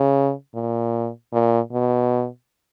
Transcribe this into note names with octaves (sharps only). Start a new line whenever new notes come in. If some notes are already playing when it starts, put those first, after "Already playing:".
Already playing: C#3
A#2
A#2
B2